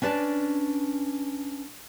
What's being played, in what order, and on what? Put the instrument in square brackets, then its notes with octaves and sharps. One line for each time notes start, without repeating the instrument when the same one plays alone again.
[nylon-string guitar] C#4 D4 B4 D5 A5